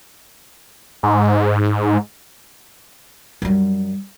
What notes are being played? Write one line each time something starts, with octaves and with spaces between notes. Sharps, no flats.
G#2
F#2 G3